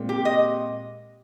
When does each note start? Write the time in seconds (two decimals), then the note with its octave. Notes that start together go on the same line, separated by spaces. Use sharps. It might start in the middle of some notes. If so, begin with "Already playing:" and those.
Already playing: A#2 G#3 C4
0.09 G4
0.25 D#5